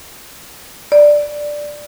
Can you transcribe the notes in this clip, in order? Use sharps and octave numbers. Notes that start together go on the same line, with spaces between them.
D5